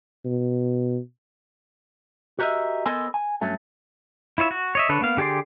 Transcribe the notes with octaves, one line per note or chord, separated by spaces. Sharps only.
B2
F#4 G4 A#4 C#5 D#5 E5
B3 A4 A#4 C5 D#5 G#5
G#5
G2 F#3 A3 C#4
E4 F4 C#5 E5
F#4
C#5 D#5 E5
D3 D4 B4 C#5
A#3 B3 F5
D3 G4 G#4 D5 C6